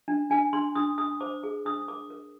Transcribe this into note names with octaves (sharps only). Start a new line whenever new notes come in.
D4
D4 G#5
D4 C6
D4 D#6
D4 D#6
C5 D6
G#4 D6
D4 D#6
A#4 D6
A#4